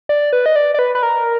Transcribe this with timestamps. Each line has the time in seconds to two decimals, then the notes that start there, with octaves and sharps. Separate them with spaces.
0.09 D5
0.33 B4
0.46 D#5
0.56 D5
0.74 D5
0.79 B4
0.95 B4
1.03 A#4